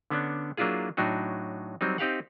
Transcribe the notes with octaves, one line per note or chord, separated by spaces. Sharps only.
D3 B3 C#4 D4
F#3 A#3 D4 E4 F4 G#4
A2 F#3 D4 D#4 F#4
F#3 G3 C4 D#4
C4 D#4 G4 F5 F#5